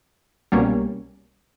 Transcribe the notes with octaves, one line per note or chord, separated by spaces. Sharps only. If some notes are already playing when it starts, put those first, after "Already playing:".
C2 B2 G3 A#3 C#4